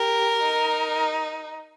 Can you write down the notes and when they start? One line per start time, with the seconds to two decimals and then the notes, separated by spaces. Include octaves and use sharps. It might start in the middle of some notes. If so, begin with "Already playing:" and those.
Already playing: G4 A#4
0.41 D#4